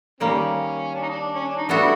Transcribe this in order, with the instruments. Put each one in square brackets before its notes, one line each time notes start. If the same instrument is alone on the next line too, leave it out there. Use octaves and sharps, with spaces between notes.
[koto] D#3 G3 A#3 [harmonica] C#4
[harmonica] D4
D#4
D4
C#4
D4
D#4
[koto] G3 B3 D4 F#4 A4 [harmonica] E4